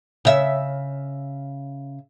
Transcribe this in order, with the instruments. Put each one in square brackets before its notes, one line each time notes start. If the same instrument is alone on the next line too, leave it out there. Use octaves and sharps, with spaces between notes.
[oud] C#3 E5